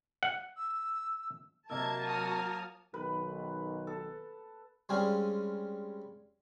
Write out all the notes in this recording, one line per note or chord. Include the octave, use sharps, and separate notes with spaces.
F#5
E6
C3 F#3 A#3 A#4 D#5 A5 E6 G#6
F#4 D#6 F6
B1 D#3 B4
A4
G3 G#3 C4 C#4 G#4 F5